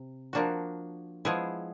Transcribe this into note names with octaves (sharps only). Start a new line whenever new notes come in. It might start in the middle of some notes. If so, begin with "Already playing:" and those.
Already playing: C3
F3 A#3 D4 F#4
F3 G#3 B3 E4 G#4